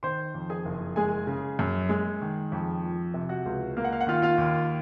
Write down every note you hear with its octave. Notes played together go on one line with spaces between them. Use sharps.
D#3 C5 C6
F2
G#4 G#5
F#1
G#3 G#4 G#5
C#3
F#2
G#3
D#3
F2
F3
C3
F#4 F#5
C#2
A#3 F5
F#5
F5
F#5
D#3 F4 F5
F4 F5
D#2